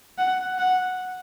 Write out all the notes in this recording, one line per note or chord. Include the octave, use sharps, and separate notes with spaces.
F#5
F#5